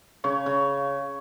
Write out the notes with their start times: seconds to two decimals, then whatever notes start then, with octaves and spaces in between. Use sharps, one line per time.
0.24 C#3 C#5
0.46 C#3